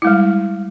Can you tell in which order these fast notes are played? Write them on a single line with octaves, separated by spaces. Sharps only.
E4 G#3 G3